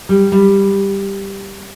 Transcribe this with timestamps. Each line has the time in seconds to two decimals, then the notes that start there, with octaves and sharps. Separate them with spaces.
0.09 G3
0.32 G3